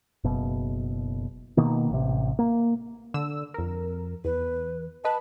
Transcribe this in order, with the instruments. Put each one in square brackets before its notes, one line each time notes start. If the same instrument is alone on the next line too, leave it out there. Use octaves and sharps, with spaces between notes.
[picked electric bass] F#1 B2
B2 D#3 A#3
A1 C3
A#3
[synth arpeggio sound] D3 E6
F2 A#4
[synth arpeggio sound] E2 [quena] B4
[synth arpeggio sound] B4 D#5 [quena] A5